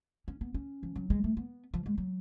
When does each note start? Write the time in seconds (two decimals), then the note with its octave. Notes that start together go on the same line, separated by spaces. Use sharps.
0.28 C#4
0.41 B3
0.54 C#4
0.83 F3
0.96 F#3
1.10 G#3
1.24 A3
1.37 B3
1.74 F3
1.86 G#3
1.98 F#3